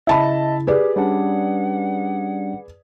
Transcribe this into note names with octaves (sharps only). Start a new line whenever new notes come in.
C#3 E4 D#5 E5 A5 B5
G4 G#4 B4 D5
G3 C#4 D4 F#5